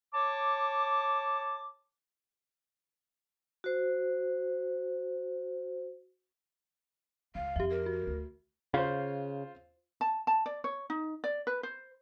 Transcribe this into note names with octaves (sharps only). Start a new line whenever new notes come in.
C#5 A5 D6
F#4 C5
C#2 F5
F2 G4 E5
A#4
F#4
D2
C#3 F4 C5
A5
A5
D5
C#5
D#4
D5
B4
C5